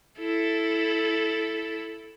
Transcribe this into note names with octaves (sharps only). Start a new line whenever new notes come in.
E4 A4